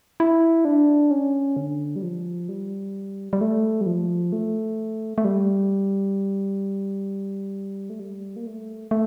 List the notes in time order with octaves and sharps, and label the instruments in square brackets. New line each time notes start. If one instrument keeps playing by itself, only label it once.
[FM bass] E4
D4
C#4
D3
G3
F3
G3
G3
A3
G3
F3
A3
A3
G3
A3
G3
A#3
A3
A3